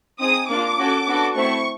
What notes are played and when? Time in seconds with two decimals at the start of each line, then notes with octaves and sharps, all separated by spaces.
0.20 C4 D#4 G#4 D#6
0.49 A#3 D4 F4 D6
0.78 C#4 F#4 A4
1.07 B3 D4 F#4 A4
1.35 A3 C4 E4 C#6